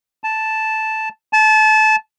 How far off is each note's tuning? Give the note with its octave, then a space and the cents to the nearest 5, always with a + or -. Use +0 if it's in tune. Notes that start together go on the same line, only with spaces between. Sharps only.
A5 -5
A5 -25